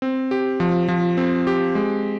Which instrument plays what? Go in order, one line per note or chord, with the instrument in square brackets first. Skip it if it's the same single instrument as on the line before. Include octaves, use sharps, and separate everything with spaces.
[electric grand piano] C4
G4
F3
F3
C4
G4
G#3